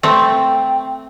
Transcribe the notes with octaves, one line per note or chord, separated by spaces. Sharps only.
A3 C4 G5